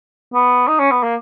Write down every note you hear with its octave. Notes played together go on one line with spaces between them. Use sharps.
B3
D#4
C#4
B3
A#3